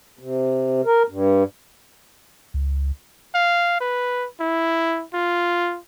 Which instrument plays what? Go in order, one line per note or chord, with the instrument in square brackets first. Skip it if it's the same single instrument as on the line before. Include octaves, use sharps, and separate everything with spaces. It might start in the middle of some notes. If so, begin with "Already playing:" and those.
[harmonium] C3
A#4
G2
[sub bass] C#2
[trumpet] F5
B4
E4
F4